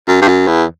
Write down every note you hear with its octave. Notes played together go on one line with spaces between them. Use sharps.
F#2
G2
F#2
E2